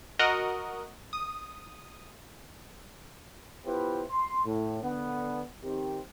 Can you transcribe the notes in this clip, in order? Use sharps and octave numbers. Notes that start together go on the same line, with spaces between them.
F#4 A#4 D#5 F#5
D#6
B3 E4 F4 G4 B4 C5
C6
A2
D3 B3
D#3 C4 G4